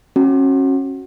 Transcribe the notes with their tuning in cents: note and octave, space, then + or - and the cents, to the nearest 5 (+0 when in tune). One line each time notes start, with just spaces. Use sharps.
C#4 -30 F#4 +0 F#5 +0